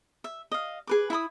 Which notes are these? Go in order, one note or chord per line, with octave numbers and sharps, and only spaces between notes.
E5
D#5 F5
G#4 B4 D6
E4 E5 B5 D#6